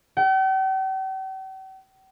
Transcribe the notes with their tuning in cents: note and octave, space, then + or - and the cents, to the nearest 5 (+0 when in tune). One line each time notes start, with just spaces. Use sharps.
G5 -45